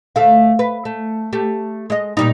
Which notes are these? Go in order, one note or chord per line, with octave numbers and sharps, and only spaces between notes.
D2 A3 F5
B4
A3
A3 G4
G#3 D#5
A#2 G3 D#4